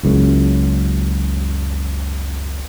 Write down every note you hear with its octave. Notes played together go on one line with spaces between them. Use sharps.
F#1 C#2 F#2